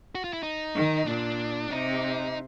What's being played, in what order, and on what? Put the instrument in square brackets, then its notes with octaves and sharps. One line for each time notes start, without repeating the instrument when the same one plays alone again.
[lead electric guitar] F#4
F4
E4
D#4
[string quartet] D#3
[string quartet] A#2 [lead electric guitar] D4
[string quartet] C3 [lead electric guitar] D#4